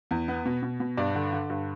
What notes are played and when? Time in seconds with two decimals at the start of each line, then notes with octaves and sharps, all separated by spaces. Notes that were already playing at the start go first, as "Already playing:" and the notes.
0.11 E2
0.28 B3
0.45 B2
0.63 B2
0.80 B2
0.97 G2 D5
1.15 D3
1.32 D3
1.50 G2